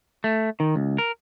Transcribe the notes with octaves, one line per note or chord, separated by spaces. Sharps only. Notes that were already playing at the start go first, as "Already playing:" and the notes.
A3
D#3
C#2
A#4